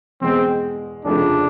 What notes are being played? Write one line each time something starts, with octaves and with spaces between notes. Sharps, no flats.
E2 B2 G#3 C4
F1 F2 C#3 F3 A3 D4